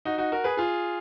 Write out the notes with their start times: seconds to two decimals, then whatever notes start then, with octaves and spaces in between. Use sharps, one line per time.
0.05 D#4 F#4
0.18 D#4 F#4
0.32 F#4 A#4
0.44 G#4 B4
0.57 F4 G#4